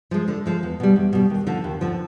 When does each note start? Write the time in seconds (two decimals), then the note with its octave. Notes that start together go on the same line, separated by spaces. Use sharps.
0.11 F3 G#3
0.28 D3
0.46 F3 G#3
0.63 E2
0.80 B2 G3
0.96 E2
1.13 B2 G3
1.30 D#2
1.47 D3 F3
1.64 D#2
1.81 D3 F3